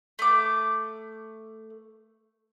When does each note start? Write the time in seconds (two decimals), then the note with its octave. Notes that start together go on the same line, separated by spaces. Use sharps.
0.19 A3 D6